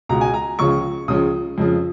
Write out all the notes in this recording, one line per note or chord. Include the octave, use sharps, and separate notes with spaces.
C#2 B2 A#5
G#5
A#5
C#2 C#3 F3 C#6
C#2 C#3 F3 D#6
F2 C#3 F3